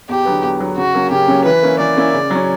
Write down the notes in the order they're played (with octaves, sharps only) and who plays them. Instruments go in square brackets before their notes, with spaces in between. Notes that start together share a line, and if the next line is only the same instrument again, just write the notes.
[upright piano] E2 [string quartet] G4
[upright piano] D3 F#3 B3
E2
D3 F#3 B3
[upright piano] C#3 [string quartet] F#4
[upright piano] F#3 A#3 C#4
[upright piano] C#3 [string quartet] G4
[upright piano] F#3 A#3 C#4
[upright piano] E3 [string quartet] B4
[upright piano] A#3 C#4 E4
[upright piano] E3 [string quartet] D5
[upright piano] A#3 C#4 E4
C#3
F#3 C#4